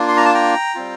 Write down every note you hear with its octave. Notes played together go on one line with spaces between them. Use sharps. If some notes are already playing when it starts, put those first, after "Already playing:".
Already playing: A#3 D4 F4
C6
A#5
A5
G5 A#5
G3 C4 F4